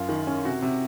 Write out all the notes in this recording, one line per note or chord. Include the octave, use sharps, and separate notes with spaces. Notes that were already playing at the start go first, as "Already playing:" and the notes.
Already playing: F#2 F4
D#3
C#4
C3 F#4
C3